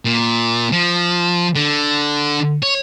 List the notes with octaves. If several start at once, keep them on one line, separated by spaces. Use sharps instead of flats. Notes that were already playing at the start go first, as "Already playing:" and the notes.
A#2
F3
D3
C#5